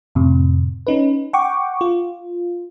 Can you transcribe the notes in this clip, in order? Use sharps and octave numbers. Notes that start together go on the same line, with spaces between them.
F2 A2 C3
C#4 D#4 B4
F#5 G5 C#6 D6
F4